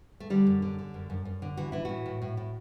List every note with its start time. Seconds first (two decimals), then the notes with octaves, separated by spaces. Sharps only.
0.20 A3
0.30 D3 G3
0.47 F#2
0.62 D3
0.79 D3
0.94 F#2
1.10 F#2
1.25 F#2
1.42 D3
1.57 E3 F#4
1.72 E3 E4
1.85 A2 F#4
2.06 A2
2.22 A2
2.37 A2